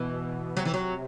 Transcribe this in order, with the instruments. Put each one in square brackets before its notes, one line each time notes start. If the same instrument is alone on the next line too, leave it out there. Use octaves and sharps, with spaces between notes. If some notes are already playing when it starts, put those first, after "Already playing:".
Already playing: [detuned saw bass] B2 [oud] E3
[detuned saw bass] C3 [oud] F#3
[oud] E3
F#3